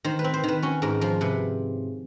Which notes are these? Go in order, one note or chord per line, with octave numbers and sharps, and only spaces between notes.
D#3 C5
B4
C4
C5
D#3 B4
C#4 F#4
G#2 A#4
F3 A#4
C3 B4